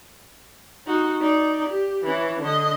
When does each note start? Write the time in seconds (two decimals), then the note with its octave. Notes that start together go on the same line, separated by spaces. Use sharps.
0.87 D#4 F#4
1.21 D#4 D5
1.69 G4
2.04 E3 C#4
2.42 D3 D#5